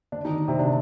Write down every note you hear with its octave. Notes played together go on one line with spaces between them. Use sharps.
D3 D4
D#3 D#4
C3 C4
D3 D4